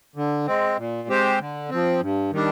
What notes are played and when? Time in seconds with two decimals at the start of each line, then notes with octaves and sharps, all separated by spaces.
0.16 D3
0.46 G#3 C4
0.78 A#2
1.09 G#3 C4 G4 C5
1.39 D3
1.69 F3 C4
2.00 G2
2.32 D#3 G3 D4